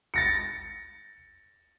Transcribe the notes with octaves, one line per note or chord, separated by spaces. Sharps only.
A6 A#6 C#7